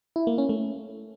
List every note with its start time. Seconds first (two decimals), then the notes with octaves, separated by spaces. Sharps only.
0.16 E4
0.27 A#3
0.38 C#4
0.49 A3